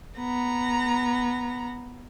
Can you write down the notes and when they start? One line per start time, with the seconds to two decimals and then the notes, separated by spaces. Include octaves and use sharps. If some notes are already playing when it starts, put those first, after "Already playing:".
0.18 B3 A#5